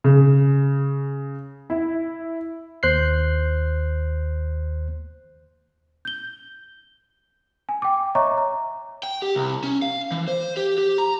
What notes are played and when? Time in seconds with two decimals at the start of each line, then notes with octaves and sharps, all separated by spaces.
0.04 C#3
1.70 E4
2.83 D#2 C5 F#6 G6 C7
6.05 G6 G7
7.69 G#5
7.82 G5 D6
8.15 C#5 D#5 E5 A#5 C#6 D6
8.38 A#5
9.03 G5
9.22 G4
9.35 C2
9.64 C#4
9.82 F5
10.11 E3
10.28 C5
10.57 G4
10.78 G4
10.98 A#5